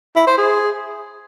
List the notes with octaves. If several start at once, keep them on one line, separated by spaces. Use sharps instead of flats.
E4
C5
G#4